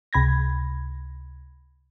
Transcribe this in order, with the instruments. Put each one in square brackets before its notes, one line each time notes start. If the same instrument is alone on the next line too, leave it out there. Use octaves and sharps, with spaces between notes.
[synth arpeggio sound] C#2 C3 B5 G#6 A#6